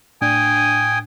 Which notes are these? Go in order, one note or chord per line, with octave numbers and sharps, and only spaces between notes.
A2 D4 G5 G#5 D#6